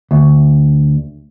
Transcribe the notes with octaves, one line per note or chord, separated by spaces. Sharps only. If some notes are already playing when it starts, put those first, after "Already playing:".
D2